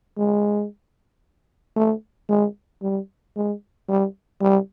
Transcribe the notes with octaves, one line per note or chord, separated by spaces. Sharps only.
G#3
A3
G#3
G3
G#3
G3
G3